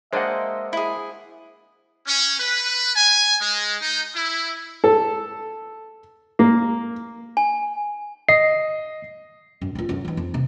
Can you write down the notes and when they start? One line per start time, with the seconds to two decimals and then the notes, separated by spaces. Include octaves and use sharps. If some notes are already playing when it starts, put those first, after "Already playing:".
0.13 G#3 A#3 D4 C5 D#5 E5 F#5
0.73 E4 G#4
2.07 C#4
2.38 B4
2.95 G#5
3.41 G#3
3.81 D#4
4.16 E4
4.84 A4
6.39 A#3
7.37 G#5
8.29 D#5 C7
9.61 F#2
9.75 D#1 F4
9.89 F#2 D3
10.05 E3 D#4
10.17 F2
10.34 C3 A#3